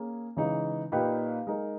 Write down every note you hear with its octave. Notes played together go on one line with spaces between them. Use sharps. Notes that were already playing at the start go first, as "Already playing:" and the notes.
Already playing: A#3 C#4 G#4
C#3 E3 G#3 D#4
A#2 A#3 D#4 G4 B4
G#3 D#4 A#4